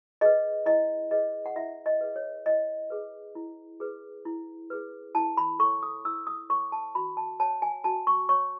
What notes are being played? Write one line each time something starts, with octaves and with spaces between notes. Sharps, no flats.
G#4 B4 D#5
E4 D#5
G#4 B4 D#5
F#5
E4 E5
D#5
G#4 B4
C#5
E4 D#5
G#4 B4
E4
G#4 B4
E4
G#4 B4
E4 A5
B5
A4 C#5 C#6
D#6
E4 E6
D#6
A4 C#5 C#6
A5
F#4 B5
A5
C#5 A5
G#5
F#4 A5
C#6
C#5 C#6